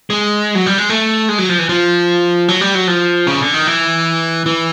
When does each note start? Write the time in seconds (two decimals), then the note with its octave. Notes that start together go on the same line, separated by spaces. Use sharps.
0.10 G#3
0.55 F#3
0.66 G3
0.78 G#3
0.90 A3
1.29 G#3
1.38 F#3
1.49 F3
1.59 E3
1.69 F3
2.48 F#3
2.61 G3
2.75 F#3
2.88 F3
3.27 C#3
3.41 D3
3.54 D#3
3.67 E3
4.46 E3